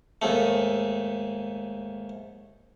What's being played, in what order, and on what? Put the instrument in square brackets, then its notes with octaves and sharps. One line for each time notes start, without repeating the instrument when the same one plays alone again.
[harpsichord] D#2 G#2 A3